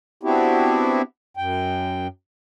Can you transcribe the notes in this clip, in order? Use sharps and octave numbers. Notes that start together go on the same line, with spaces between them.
B3 C4 D4 E4 F#4 G4
F#2 G5